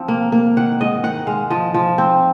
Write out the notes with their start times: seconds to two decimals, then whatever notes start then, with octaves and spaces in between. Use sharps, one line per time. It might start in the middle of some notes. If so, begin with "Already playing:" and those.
Already playing: F3 C4
0.08 A#3
0.32 A#3
0.57 D#3 F#5
0.81 G#2 D#5
1.03 D#3 F#5
1.27 G#3 F5
1.50 F3 D#5
1.74 F3
1.98 C4